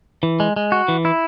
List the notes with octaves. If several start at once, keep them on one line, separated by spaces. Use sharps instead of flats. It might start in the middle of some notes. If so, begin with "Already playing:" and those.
E3
G#3
G#3
F#4
E3
E4